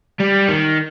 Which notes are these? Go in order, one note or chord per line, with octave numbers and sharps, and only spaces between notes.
G3
D#3